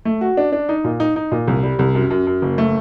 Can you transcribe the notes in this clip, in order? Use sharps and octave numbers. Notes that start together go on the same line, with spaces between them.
A3
F#4
D4
D4
D#4
A#2
D#4
D#4
A#2
C2
G3
C2
F#2
F#2
F#2
F#1
A3